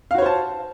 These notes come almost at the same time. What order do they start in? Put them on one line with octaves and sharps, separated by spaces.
F5 F#4 C#5 C5 A5